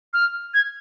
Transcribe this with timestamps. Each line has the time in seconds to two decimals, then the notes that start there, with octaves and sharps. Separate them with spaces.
0.14 F6
0.54 G#6